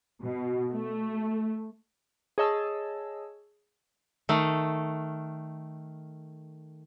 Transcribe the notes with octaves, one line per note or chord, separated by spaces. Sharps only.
B2
A3
G#4 C#5 D#5 A5 E6
D#3 A3